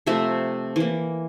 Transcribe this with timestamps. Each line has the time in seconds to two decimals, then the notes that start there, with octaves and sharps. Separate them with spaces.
0.06 C3 F3 A3 E5
0.76 E3 A#3